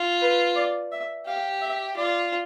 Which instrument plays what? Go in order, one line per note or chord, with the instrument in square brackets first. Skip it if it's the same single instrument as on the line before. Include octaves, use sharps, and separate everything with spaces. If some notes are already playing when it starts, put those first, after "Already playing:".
Already playing: [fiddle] F4
[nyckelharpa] B4
D5
E5
[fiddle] G4 [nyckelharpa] F5
[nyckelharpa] E5
[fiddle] F4 [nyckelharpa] D5